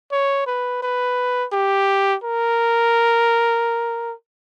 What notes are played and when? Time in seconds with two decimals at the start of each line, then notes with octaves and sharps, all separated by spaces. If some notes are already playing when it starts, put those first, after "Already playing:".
0.12 C#5
0.47 B4
0.82 B4
1.53 G4
2.24 A#4